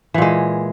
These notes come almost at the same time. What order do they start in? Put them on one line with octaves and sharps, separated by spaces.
E3 A#2 G#3